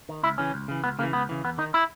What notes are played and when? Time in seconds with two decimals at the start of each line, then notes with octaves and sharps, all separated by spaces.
0.09 D#3
0.23 C#2 E4
0.38 C#3 E3 C#4
0.54 C#2
0.68 C#3 E3
0.84 C#2 B3
0.99 C#3 A#3
1.02 E3
1.13 C#2 B3
1.29 C#3 E3
1.44 E2 B3
1.58 D#3 D#4
1.74 E4